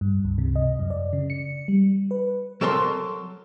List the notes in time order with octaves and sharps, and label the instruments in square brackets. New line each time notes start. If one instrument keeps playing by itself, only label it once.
[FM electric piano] G2
C#2
C3
D#5
F#2
D5
C#3
C#7
G3
B4
[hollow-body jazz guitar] F#3 A4 A#4 A5 C6